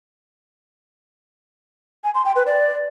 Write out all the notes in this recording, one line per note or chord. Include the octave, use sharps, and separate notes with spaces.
G#5
C6
G5
B4
D5